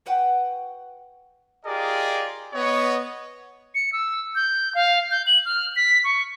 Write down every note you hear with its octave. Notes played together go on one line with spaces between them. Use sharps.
F#4 B4 F#5 G5
F4 G4 G#4 A#4 D5 D#5
B3 C#5 D#5
C#7
E6
G6
F5
G6
F#7
F6
B6
C#6